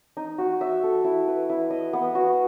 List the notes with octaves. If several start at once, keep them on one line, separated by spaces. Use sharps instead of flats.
D#4
F#4
E5
A4
E4
B4
E4
D#5
B3
F#4